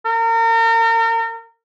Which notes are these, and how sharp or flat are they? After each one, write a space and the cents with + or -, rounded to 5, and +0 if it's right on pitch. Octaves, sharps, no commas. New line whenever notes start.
A#4 -35